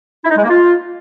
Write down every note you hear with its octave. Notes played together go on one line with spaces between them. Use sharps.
E4
D#4
G#3
A#3
F4